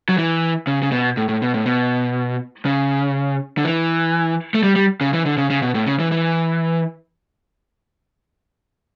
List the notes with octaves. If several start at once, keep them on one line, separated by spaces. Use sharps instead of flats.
F#3
E3
C#3
C#3
B2
A2
A2
B2
A2
B2
C#3
D3
E3
A3
G3
G3
C#3
E3
D3
C#3
C#3
B2
A2
C#3
E3
E3